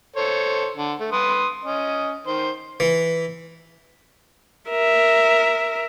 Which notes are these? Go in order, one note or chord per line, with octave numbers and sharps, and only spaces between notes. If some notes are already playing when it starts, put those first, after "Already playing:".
A4 C5 C#5
D3
A3
B4 C6 D#6
C#4 D#5
D#3 C5
E3
A#4 E5